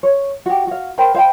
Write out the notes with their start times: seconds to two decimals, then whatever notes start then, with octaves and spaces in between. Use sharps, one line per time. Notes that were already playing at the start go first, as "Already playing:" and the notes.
0.03 C#5
0.46 F#4 G4
0.67 F#4 F5
0.98 A#4 C5 G5 B5
1.15 C5 F5 G5 B5